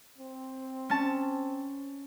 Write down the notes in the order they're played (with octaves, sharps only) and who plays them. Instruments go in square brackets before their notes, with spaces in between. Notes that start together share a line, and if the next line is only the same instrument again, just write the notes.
[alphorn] C4
[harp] C#4 A5